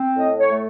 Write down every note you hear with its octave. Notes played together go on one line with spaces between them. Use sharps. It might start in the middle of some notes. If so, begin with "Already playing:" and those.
Already playing: C4
A2 D#5
C#5
A3